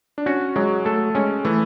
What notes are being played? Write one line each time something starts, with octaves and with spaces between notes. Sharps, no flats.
D4
C#4 F#4
F#3 G#3
A3 A4
G#3 C#4
E3 A3